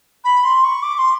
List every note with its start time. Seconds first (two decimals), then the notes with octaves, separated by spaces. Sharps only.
0.24 B5
0.44 C6
0.64 C#6
0.82 D6
0.98 C6